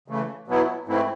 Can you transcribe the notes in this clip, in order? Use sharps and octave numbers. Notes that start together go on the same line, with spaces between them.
C#3 E3 A3
B2 F#3 B3 E4
G#2 E3 A3 C4 E4